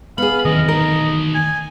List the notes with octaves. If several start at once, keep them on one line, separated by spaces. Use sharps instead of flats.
B3 G#4 F5 B5
D#2 D#3 E3 A3 C4 D#5
B3 D#4 A#4
G#5